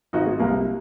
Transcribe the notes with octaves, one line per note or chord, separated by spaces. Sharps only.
G#1 D#4 F#4
G#3
C2 A#3